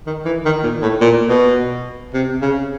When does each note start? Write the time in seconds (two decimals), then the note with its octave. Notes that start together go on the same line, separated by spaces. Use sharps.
0.07 D#3
0.25 E3
0.45 D#3
0.63 A#2
0.82 A2
1.01 A#2
1.29 B2
2.14 C3
2.42 C#3